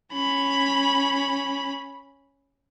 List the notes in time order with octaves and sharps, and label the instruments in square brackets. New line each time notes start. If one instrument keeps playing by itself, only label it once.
[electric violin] C#4 B5